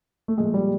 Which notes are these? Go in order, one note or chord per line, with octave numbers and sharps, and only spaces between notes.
A3
A#2 F3 G#3
G3